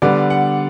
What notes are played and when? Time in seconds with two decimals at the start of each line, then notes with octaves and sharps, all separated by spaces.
0.02 D3 G3 B3 D5
0.30 F#5